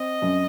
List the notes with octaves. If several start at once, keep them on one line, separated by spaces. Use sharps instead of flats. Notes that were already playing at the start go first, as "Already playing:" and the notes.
Already playing: C4 D#5
F#2